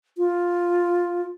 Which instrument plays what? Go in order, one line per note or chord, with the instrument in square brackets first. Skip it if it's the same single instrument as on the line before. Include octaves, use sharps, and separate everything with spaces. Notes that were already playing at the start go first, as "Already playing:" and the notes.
[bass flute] F4